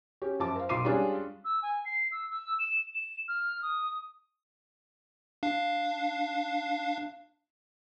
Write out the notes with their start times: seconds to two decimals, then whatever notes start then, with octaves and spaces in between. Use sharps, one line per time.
0.22 C#4 G4
0.39 F#2 F3 A5 D6
0.55 A#4 C5 F5
0.69 B1 F4 C6 D6 C7 D#7
0.85 G3 G#3 C#4 D4 F4 G#4
1.45 E6
1.63 G#5
1.85 C7
2.12 E6
2.30 E6
2.59 E7
2.94 E7
3.28 F6
3.62 D#6
5.43 D4 F5